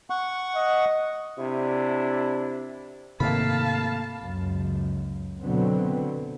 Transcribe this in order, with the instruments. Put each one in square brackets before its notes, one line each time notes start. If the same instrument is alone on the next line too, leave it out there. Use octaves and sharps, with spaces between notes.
[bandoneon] F#5 C#6
[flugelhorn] D#5
[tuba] C3 [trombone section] D4 E4
[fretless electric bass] G#2 C3 D#3 [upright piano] A3 A#3 [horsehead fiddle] F5 A5 [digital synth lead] B5
[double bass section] C#2 F#2
B2 D3 F#3 B3 C4